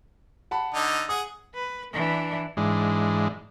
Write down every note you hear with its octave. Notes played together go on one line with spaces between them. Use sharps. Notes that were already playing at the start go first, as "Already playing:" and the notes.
F#5 A5 B5
D3 D#4
G#4 F#5 D#6
B4
E3 D4
G#2 E3 G#3 D4